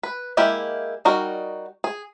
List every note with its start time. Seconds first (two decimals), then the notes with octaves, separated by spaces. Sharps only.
0.03 B4
0.37 G#3 A#3 E4 G4
1.05 G3 D#4 F#4 A#4
1.84 G#4